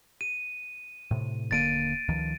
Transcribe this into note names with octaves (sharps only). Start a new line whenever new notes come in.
D#7
A2 C3
D#1 D3 A#3 A6 D7 D#7
C#2 D#3 F3